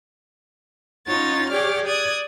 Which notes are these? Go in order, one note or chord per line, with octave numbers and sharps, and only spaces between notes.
C#4 D#4 F4 C#5 F#5 A6
G4 G#4 C#5 D5 D6 F6
D5 D#6 F#6 G#6